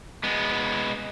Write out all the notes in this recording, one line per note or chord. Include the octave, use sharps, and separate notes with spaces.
G#3 B3